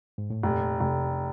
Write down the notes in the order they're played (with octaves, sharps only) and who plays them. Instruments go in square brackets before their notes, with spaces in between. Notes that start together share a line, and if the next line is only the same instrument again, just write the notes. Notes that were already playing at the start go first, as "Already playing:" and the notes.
[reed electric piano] G#2
A2
[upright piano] F1 [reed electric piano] A#2
[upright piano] F1 [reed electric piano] C3